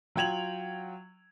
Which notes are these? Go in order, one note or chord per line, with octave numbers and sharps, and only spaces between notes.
F#3 F4 G5 G#6 F7 F#7